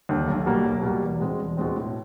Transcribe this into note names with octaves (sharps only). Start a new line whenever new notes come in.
D#2 D3
B1
B2 G3 A#3
B1
B2 G3 A#3
E2
B2 G#3 C4
E2
B2 G#3 C4
A2